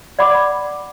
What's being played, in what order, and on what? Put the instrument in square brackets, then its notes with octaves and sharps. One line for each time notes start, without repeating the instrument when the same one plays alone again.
[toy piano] D5 F#5 B5 D6